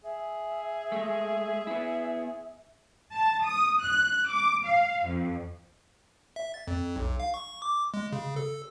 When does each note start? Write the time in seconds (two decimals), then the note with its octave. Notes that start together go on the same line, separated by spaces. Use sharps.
0.04 G#4 E5
0.92 G#3 A3
1.67 B3 E4
3.12 A5
3.44 D#6
3.82 F#6
4.28 D6
4.65 F5
5.05 F2
6.36 E5
6.54 A6
6.67 F2
6.96 B1
7.20 F5
7.34 C#6
7.62 D6
7.94 G#3
8.12 C#3
8.36 A4